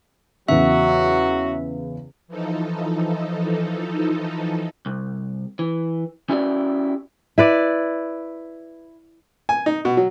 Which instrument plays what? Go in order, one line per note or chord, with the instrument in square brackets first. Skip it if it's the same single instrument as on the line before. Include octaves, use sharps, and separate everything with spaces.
[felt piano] E2 C#3 [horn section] F#3 F#4 [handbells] E5
[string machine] E3 F3 D#4 A4
[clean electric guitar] C2
E3
C#4 E4 F#4 G4 C5 D5
[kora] E4 B4 D5
[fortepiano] G#5
D#4
B2
F#3